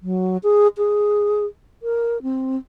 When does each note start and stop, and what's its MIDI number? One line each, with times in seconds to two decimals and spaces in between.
0.02 0.37 54
0.43 0.68 68
0.78 1.45 68
1.83 2.21 70
2.22 2.57 60